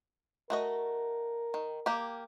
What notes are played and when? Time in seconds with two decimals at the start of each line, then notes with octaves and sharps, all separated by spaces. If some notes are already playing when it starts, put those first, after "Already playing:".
0.50 A3 F#4 A#4 D#5
1.54 D#3
1.86 A#3 G4